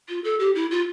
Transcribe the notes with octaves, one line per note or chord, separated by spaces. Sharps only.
F4
A4
G4
E4
F4